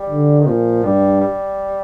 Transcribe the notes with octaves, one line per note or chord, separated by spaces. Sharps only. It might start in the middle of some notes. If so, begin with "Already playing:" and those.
Already playing: G3
D3
D#3
A#2 F3
G2 G3
G3